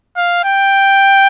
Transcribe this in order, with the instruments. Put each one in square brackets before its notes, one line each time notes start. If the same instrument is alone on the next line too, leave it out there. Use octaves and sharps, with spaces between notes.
[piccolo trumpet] F5
G5